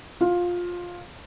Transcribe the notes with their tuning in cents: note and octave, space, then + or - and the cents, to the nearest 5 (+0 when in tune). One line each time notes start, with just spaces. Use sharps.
F4 +15